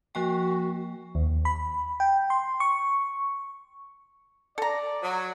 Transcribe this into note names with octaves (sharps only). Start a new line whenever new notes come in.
F3 A#3 F#4 G5
D#2
B5
G5
C6
C#6
A4 D5 A#5
F#3